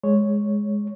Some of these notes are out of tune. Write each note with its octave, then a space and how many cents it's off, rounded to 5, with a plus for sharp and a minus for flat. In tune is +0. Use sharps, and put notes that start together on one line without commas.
G#3 +0 C#5 +0